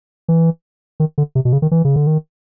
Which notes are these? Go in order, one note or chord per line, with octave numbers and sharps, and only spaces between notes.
E3
D#3
D3
C3
B2
C#3
D#3
E3
C#3
D3
D#3